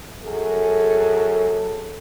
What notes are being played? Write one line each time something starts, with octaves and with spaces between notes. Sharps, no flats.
F#2 G#4 A4